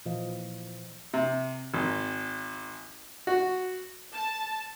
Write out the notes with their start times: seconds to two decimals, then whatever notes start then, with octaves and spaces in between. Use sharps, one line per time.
0.06 A#2 E3 F3 D#5 F5
1.14 C3
1.74 G#1
3.27 F#4
4.14 A5